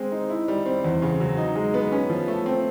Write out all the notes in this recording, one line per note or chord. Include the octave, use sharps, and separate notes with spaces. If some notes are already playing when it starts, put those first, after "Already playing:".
Already playing: G#3 C4
D#4
E4
G3
C4
E2
C#3
F#3
D#4
G#3
B3
C#4
F3
A3
C4